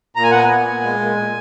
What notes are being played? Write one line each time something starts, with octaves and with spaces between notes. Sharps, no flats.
A#2 A#5
G#5
B3 F#5
G#5
B3
A#2
G#3
A#2
A#2